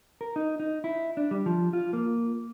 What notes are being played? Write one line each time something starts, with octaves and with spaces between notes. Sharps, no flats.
A#4
D#4
D#4
E4
D4
G3
F3
F4
A#3